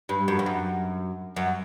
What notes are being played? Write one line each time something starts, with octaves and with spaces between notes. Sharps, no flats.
G2
F#2
F2
F#2
F#2